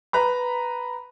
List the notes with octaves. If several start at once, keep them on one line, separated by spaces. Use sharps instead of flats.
B4 A#5 B5